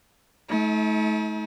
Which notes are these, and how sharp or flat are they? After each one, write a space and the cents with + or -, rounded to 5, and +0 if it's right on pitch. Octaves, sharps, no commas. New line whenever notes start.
A3 -35 D#4 +40